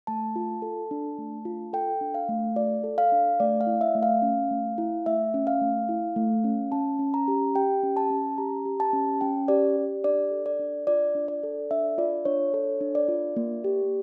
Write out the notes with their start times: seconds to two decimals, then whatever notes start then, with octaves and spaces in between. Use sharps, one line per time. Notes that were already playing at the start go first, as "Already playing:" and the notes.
0.07 A3 A5
0.36 F4
0.62 A4
0.91 D4
1.18 A3
1.45 F4
1.73 A4 G5
2.01 D4
2.14 F5
2.29 A3
2.56 F4 D5
2.84 A4
2.98 F5
3.12 D4
3.40 A3 D5
3.61 F5
3.67 E4
3.81 E5
3.95 A3
4.03 F5
4.22 C#4
4.51 A3
4.78 E4
5.06 A3 E5
5.34 C#4
5.47 F5
5.61 A3
5.89 E4
6.16 A3
6.44 C#4
6.72 C#4 A5
6.99 C#4
7.14 A#5
7.28 G4
7.55 G4 G5
7.83 C#4
7.97 A5
8.10 C#4
8.38 G4 A#5
8.65 G4
8.80 A5
8.93 C#4
9.21 C#4 G5
9.48 G4 D5
9.77 G4
10.04 D4 D5
10.31 A4
10.46 D5
10.59 D4
10.87 F4 D5
11.15 D4
11.28 D5
11.43 A4
11.71 D4 E5
11.98 F4 D5
12.25 D4 C#5
12.54 A4 C#5
12.81 D4
12.95 D5
13.09 F4
13.36 A#3
13.64 G4